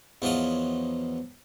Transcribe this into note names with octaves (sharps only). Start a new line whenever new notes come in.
E2 F3 F#3 F4 D#5